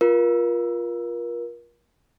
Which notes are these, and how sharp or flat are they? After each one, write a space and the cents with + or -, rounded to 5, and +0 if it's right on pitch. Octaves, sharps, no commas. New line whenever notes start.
F4 +0 A#4 +30